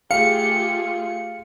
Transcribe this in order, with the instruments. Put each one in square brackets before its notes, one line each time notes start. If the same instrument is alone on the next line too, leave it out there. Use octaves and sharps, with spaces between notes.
[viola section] A3 F4 G#4 [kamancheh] G4 [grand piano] F5 [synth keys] C#7